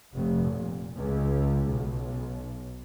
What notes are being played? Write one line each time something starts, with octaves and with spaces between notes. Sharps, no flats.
F1
A#2
C#2
B1